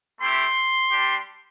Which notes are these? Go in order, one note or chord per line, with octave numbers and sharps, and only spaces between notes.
A3 C4 E4 G4 C6
G3 D4 G4